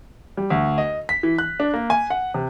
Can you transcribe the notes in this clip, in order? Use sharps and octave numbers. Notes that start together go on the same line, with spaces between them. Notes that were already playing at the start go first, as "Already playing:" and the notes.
G3
D2
D#5
B6
E3
F#6
D4
A#3
G#5
F#5
C3